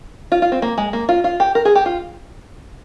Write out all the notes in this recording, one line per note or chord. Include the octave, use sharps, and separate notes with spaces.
F4
F4
C4
A#3
G#3
A#3
F4
F4
G4
A#4
G#4
G4
F4